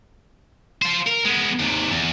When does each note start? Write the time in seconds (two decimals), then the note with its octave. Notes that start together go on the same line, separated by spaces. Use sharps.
0.82 F4 C5
1.07 A#4
1.25 G#3 B3
1.59 D#2 C3
1.91 E2